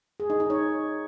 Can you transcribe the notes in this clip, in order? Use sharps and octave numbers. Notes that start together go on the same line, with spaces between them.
G#4
D#4
D#4
C#5